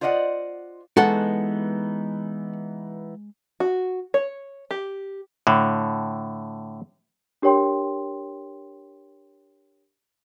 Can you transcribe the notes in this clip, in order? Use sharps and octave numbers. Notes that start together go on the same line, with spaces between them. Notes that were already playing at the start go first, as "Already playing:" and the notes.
F4 C5 D5 D#5 F5 F#5
E3 G#3 B3 D#4 F#4 A4 F#5
F#4
C#5
G4
A2 D3
D4 G4 A#4 C#5 G5 C6